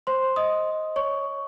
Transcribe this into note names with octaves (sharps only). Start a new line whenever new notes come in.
C5 C6
D#5 D#6
C#5 C#6